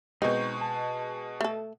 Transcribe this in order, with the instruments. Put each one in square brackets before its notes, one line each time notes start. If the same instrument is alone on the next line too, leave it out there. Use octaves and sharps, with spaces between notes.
[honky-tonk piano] B2 G#3 [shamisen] C4 [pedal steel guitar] D#4 C#6 G6
[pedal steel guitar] A5
[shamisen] A3 A4